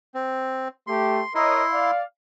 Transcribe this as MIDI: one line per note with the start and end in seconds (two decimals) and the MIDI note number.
0.14 0.68 60
0.87 1.22 57
0.87 1.22 67
0.87 1.35 84
1.35 1.91 64
1.35 1.63 70
1.35 1.63 73
1.35 1.63 75
1.35 1.91 84
1.72 2.02 74
1.72 2.02 77